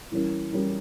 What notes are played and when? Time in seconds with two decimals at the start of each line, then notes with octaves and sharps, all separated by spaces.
0.12 E3 G3 C#4 E4 A#4
0.52 E3 G3 C#4 E4 A#4